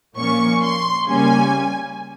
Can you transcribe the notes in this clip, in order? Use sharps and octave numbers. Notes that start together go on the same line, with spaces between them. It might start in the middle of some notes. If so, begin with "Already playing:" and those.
A#2 F3 A#3 C#4 C#6
C6
C#3 G3 A#3 C#4 G#5